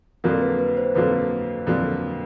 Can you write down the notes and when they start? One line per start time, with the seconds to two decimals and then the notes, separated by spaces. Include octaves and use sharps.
0.24 F2 D3 F#3 A#3 A#4
0.41 B4
0.59 B4
0.77 C5
0.95 F2 D3 F#3 A#3 B4
1.66 F2 D3 F#3 A#3